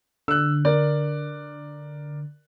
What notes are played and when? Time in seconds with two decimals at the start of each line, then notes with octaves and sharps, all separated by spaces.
0.28 D3 E6 F#6
0.65 A#4 D5